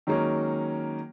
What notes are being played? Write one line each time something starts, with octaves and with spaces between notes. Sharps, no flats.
D#3 F#3 G#3 A#3 C#4